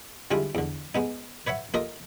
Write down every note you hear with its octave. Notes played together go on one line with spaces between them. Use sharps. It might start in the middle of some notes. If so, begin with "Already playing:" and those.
D3 G3 G#3 E4 F4
E2 D3
G#3 B3 D#4
B4 C#5 E5 F#5
A#3 F4 A4 A#4 D#5